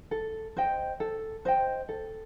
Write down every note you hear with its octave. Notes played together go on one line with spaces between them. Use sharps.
A4
C5 D#5 G5
A4
C5 D#5 G5
A4